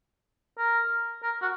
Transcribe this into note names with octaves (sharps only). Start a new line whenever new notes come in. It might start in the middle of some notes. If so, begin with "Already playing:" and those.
A#4
A#4
F#4